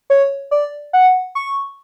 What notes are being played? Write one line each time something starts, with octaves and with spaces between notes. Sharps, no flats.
C#5
D5
F#5
C#6